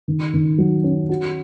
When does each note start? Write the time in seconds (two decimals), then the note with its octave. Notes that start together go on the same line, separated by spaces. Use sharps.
0.08 D#3
0.33 D#3
0.58 F#3
0.84 C#4
1.09 F#4